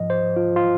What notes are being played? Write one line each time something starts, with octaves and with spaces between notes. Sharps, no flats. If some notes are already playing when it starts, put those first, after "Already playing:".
Already playing: G#2 F3 D#5
C5
F4
F4